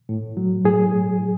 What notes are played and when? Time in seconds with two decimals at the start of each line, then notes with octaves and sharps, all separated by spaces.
0.09 A2
0.37 F#3
0.65 A2 G#4
0.92 A2